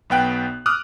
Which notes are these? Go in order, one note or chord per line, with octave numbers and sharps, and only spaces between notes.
B1 B3 G5 F#6
D6 D#6 F6 F#6